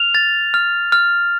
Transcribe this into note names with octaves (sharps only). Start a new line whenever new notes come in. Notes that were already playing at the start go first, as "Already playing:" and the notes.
Already playing: F6 F7
A6
F6
F6